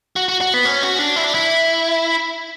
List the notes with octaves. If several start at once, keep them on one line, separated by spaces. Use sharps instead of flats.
F#4
F#4
F#4
B3
C#4
F#4
D4
E4
D4
E4